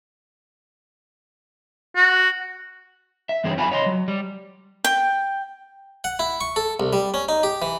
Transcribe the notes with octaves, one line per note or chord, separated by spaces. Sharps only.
F#4
E5
G2 E3 C4 G#4 C5 C#5
F#2 F4 F#5 G#5 B5
C#5 D#5 C6
F#3
G3
G5
F#5
E4
C#6
A4
C2
G3
C#4
D#4
G4
E3